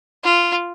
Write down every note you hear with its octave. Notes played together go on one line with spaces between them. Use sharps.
F4